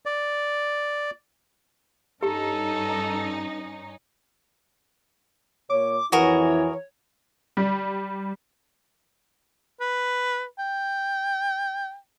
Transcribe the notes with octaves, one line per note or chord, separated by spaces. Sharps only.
D5
G2 C#4 D#4 G4 A4
A#2 C#5 D6
F2 E3 E4 F#4 G#4 A#4 C#5
G3
B4
G5